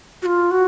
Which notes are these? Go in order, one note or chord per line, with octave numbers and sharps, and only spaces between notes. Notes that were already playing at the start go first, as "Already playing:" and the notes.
F#4
F4
F#4